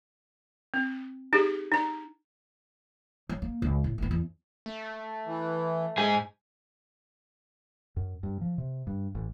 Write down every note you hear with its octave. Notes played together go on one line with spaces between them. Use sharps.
C4
D#4 G4 G#4
D#4 A#5
F#3
A#3
C#2
A2
A1 B3
E2
A3
E3
G#2 G#4 G#5
F#2
G2
F3
C3
G2
A1